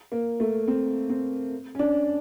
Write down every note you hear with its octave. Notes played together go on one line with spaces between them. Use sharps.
A#3
A3
C4
C4
C#4
D4